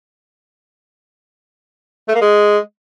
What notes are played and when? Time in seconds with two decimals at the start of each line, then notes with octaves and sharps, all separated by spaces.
2.08 A3
2.15 A#3
2.21 G#3